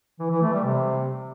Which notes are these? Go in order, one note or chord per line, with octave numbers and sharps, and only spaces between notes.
E3
E3
A3
G3
C3